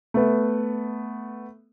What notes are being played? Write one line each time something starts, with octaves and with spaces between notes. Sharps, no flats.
A3 B3